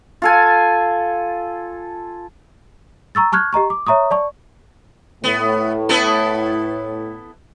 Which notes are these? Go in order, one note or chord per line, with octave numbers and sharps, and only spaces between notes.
F4 A4 G#5
A#5 C#6 E6 A6
A5 C#6 F6 F#6 G#6
G4 D#5 A#5 C#6
D6
C#5 E5 A#5 C#6 D#6
D5 A5 C#6
A2 B3
B3 E4 A4